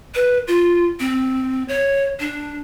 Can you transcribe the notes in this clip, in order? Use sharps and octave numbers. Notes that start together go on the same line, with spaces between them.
B4
F4
C4
C#5
D4